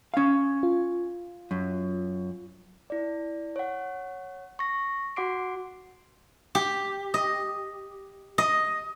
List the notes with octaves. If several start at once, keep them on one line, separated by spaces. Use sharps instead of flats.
C#4 F5
F4
F#2
E4 D5
C#5 F#5
C#6 A#6
F#4 F#5 C6 D6 C7 D7
G4
D#5
D#5